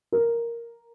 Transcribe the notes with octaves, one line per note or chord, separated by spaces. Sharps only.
A#4